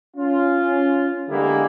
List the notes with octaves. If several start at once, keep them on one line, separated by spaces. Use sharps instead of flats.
C#4 F4
D3 G3 G#3 A#3 B3 E4